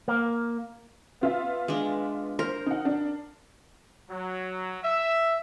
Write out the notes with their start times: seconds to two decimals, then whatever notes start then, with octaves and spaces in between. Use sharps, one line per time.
0.08 A#3
1.21 B3 F4 E5
1.68 G#3 D4
2.39 A#4 C5
2.66 D#4 F#5
2.85 D4
4.10 F#3
4.84 E5